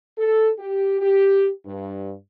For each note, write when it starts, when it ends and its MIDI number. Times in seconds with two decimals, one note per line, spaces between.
0.18 0.50 69
0.59 1.00 67
1.01 1.49 67
1.66 2.13 43